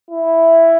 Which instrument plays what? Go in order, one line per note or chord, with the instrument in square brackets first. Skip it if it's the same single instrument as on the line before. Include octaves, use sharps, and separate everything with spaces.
[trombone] E4